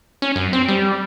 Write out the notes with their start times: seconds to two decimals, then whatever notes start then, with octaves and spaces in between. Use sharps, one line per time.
0.22 C#4
0.36 F#2
0.53 C4
0.68 G3